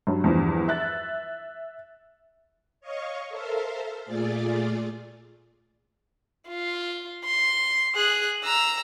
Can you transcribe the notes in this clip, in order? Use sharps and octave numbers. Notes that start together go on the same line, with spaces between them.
G2 F#3
E2 G2 F3
E5 F#6 A6
C#5 D#5 F5 C#6
A4 A#4 C5 E5 F5
A#2 A3 F4 G#4 D5 A6
F4
C6
G#4 F#6
A#5 E6